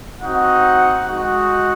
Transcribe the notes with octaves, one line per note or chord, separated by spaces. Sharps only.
C4 D#4 F#4 F#5
G#3 D#4 F#4 F#5